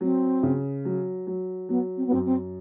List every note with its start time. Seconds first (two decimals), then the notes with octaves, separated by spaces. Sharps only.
0.01 F#3 C4
0.43 C#3
0.85 F#3
1.27 F#3
1.69 F#3 B3
1.97 C4
2.06 B3
2.11 F#2 C4
2.25 C4